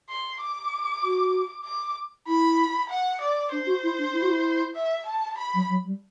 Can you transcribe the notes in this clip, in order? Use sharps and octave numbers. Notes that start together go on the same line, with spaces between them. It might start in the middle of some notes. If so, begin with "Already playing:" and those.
C6
D6
F#4
D6
E4 B5
F#5
D5
D4 C5
F#4
E4
D4
E4
F#4
E4
E5
A5
B5
F#3
F#3
G3